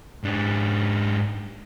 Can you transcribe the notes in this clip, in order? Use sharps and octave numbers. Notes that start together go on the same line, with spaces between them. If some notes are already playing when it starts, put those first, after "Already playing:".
G#2 D4